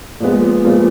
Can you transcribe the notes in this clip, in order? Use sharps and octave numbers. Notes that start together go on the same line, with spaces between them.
A#2 F3 G#3 B3
A#2 F3 G#3 B3